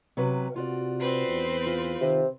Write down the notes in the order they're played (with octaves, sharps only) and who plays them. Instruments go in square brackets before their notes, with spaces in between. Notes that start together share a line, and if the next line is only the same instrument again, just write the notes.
[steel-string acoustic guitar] C3 F#3 B4
[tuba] C3 [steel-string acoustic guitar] F4 F#4 D5
[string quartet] C4 B4 C5
[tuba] E2
[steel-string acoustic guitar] F4
[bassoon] C3 [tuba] D#3